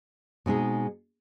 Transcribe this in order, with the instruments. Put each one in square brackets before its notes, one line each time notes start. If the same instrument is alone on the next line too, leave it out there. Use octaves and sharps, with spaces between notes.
[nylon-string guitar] B2 G#3 C4 D#4 G#4